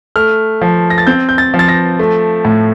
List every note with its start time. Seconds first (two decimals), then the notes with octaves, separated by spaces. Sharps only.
0.16 A3 F6
0.62 F3
0.90 A#6
0.98 A6
1.07 C4 G6
1.29 G6
1.38 A6
1.54 F3
1.59 A6
1.68 A#6
1.99 A3
2.45 A2